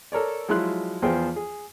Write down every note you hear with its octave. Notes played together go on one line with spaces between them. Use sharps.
A4 A#4 C#5 D5
F3 F#3 G#3 E4 C6 F#6
E2 F3 B3 G#4 C5 G5
G#4